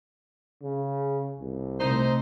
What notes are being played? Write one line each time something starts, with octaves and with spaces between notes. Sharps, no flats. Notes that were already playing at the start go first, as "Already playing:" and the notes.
C#3
C2
C3 A3 D#4 C5